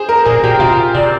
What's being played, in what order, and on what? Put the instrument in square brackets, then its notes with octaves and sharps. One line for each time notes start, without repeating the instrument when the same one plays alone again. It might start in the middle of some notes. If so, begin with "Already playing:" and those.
Already playing: [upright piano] G#4 C5
A#4
[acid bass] A#2 [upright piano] G#4
[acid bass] A#2 [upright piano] G4
[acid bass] C3 [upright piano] F4
[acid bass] C3 [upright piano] D5